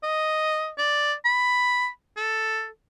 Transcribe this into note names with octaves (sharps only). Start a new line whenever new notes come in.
D#5
D5
B5
A4